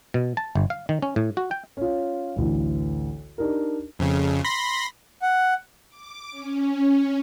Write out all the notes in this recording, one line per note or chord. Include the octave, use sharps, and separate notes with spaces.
B2
A5
G1
F5
D#3
C#4
A2
F#4
G5
C#4 F4
A1 D2 E3
D4 D#4 G4 A#4
F2 C#3
B5 C6 A#6
F#5
D6
C#4